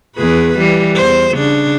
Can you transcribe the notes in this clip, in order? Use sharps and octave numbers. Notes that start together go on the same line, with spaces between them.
E2 G#4 B4
E3 G3
E2 C5
C#3 D4